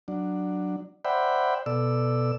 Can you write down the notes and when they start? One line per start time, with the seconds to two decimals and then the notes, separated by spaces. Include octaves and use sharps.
0.08 F#3 D4
1.05 C5 D5 E5 F#5 G5 B5
1.66 B2 A4 D5 E6